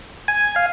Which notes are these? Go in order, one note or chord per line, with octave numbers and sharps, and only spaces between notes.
G#5
F5